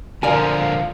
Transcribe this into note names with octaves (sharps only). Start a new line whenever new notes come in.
D3 F3 A#4 D5 F5 G#5